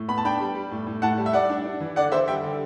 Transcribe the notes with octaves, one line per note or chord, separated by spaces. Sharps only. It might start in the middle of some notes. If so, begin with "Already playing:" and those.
Already playing: A2
B3 B5
A5
D4 G5 B5
G3
G3
A2
A2
A2 F#5 A5
G3
E5
G3 D5 F#5
D4
D4
E3
D3 D5 F#5
D3 C5 E5
G3 E5 G5
D3